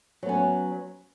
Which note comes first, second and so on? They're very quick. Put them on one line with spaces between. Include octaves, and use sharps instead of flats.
F#3 B3 C#4